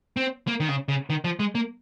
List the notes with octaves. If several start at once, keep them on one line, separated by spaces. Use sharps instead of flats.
C4
A#3
D#3
C#3
C#3
D#3
F3
G#3
A#3